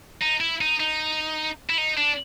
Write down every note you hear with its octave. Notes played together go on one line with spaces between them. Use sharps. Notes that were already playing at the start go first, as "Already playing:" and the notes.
D#4
E4
D#4
D#4
E4
D#4
D4